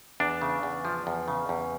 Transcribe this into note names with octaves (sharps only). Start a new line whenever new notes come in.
E2 D4
C#3
E2
F3
E2
C#3
E2